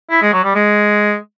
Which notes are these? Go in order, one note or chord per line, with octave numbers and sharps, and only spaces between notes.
E4
G#3
F#3
G3
G#3